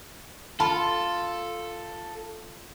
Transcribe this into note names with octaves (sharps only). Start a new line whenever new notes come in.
F4 A4 A5 B5